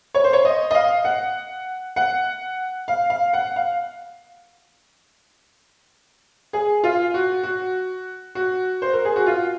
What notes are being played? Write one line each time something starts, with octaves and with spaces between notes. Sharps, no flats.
C#5
C5
C#5
D#5
D#5
F5
F#5
F#5
F5
F5
F#5
F5
G#4
F4
F#4
F#4
F#4
C5
A#4
G#4
F#4
F4